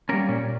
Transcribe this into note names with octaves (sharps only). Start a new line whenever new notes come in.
G3 A#3 C#4 A#4
A#2 C#4